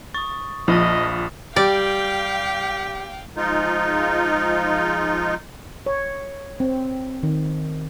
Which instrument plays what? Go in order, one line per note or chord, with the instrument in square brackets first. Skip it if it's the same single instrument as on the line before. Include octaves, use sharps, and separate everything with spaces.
[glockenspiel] C#6 D#6 [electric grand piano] A6
[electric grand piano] A#1 [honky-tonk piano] F3 [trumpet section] D#5 [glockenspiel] B5 D#6 A6
[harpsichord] G3 [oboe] G4 [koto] D5 [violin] F5 G5
[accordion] F3 G#3 D#4 F4
[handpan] C#5
C4
D#3